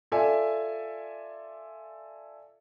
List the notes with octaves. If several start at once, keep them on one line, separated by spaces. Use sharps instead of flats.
F4 A4 D5 E5 G#5